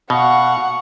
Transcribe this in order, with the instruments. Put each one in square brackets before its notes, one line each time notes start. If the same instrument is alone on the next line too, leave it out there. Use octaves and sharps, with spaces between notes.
[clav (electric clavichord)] B2 [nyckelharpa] F5 C#6 [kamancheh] F#5